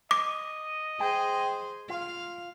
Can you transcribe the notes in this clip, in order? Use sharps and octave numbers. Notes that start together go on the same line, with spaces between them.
D#5 D6
G#4 C5 G5
F4 F5